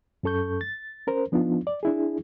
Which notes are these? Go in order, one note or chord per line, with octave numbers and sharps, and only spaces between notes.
F#2 C#4 A4 C#6 G6
A6
C#4 A#4 C5
F3 B3 D4 D#4 F4
D5
D4 E4 G#4